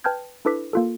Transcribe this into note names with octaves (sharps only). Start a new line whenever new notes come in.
B4 G5 A5 F6 G6 G#6
D4 E4 A4 B4 D6 B6
A#3 F4 A4